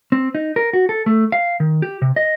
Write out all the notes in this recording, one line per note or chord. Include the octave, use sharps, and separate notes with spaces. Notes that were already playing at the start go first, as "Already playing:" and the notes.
C4
D#4
A#4
F#4
A4
A3
F5
D#3
G4
C3
D#5